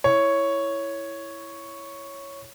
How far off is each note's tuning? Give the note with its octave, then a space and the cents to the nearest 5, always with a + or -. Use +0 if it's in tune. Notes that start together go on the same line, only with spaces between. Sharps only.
E4 +0 C#5 +0